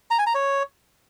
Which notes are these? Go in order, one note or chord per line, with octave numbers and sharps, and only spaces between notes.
A#5
G#5
A#5
C#5